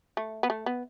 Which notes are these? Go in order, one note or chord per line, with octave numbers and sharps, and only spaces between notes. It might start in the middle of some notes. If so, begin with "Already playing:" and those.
A3
B3
A3
B3